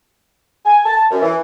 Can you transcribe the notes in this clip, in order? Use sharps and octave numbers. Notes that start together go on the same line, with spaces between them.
G#5
A5
F#2
E3